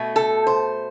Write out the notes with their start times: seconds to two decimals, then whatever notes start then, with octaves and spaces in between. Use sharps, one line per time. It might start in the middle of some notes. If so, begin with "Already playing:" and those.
Already playing: B2 A3
0.16 A4
0.47 C5